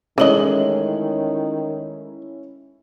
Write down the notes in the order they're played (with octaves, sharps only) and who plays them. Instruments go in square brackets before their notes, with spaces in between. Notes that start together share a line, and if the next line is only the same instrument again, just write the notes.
[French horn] D#3 [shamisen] E3 D#5 [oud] G#3 A3 [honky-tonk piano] C#4 E4 F#7